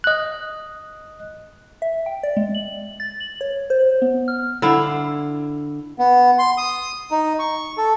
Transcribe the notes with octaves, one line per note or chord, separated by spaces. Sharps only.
D#5 F#6
E5
G5
D5
G#3
F#7
A6
F#7
C#5
C5
B3
F6
D3 E4 F5
B3
C6
D#6
D#4
C#6
A4